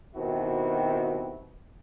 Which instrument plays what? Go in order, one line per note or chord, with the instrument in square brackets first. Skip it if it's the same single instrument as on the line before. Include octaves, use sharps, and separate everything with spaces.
[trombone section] B2 D#3 C4 E4 F#4 G4